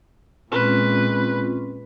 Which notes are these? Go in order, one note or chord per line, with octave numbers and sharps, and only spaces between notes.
A#2 G#3 C4 C#4 F4 B4